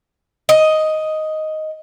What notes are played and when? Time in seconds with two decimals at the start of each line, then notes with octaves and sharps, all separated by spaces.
0.49 D#5